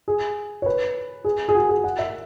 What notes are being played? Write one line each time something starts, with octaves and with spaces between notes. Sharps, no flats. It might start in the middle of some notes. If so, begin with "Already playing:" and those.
G#4
C#5
B4
G#4
G#4
F#4
G#4
F#5
E5